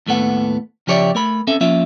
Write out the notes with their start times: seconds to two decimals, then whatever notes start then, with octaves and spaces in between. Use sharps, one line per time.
0.07 D#2 A2 A3 B3 F#5
0.87 C#3 F3 G4 C#5 D5 E5
1.15 A3 A#4 B5
1.47 C4 C#4 A4 E5
1.61 F3 A#3 C#4 F4 E5